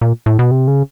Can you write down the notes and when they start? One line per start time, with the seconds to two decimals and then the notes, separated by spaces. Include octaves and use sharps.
0.01 A#2
0.26 A2
0.39 B2
0.51 C3
0.68 C#3